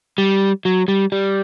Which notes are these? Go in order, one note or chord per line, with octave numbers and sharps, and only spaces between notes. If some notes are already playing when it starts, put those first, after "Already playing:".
G3
F#3
G3
G3